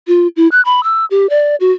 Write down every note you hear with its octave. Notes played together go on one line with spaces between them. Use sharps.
F4
E4
F#6
B5
E6
G4
D5
F#4